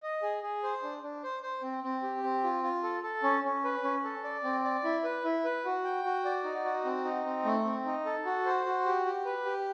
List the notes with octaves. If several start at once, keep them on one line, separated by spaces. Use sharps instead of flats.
D#5
G#4
G#4
C5
D4
D4
C5
C5
C4
C4
G4
C4
F4
F4
A4
A4
C#4
C#4
B4
C#4
A4
D5
C4
D5
E4
B4
E4
B4
F#4
G5
F#4
D5
D#4
F#4
C4
D#4
C4
A3
C4
D#4
A4
F#4
C5
F#4
G4
G4
B4
G4